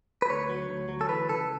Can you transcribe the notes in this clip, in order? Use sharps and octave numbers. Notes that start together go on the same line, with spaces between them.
B4
D2 C#5
F#3
D2
F#3
A4
E3 B4
C#2 A4